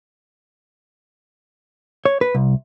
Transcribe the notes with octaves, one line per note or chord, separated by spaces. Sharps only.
C#5
B4
C2